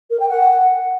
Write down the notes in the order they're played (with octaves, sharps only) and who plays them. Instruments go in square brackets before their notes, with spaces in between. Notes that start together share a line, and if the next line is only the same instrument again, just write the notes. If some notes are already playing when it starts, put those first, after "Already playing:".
[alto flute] A#4
G5
F#5